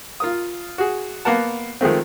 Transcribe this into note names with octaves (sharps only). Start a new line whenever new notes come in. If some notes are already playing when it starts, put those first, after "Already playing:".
F4 A#4 D#6
F#4 G#4
A#3 B3 A#4 F#5 A5
D#3 F3 G#3 A3 C4